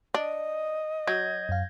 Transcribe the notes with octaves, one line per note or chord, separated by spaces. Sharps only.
D4 D#5
F#3 G6 G#6 A#6
F#2 F5